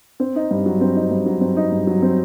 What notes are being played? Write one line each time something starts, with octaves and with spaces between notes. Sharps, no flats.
C4
D#4
G2
F#3
C4
D#4
G2
F#3
C4
D#4
G2
F#3
C4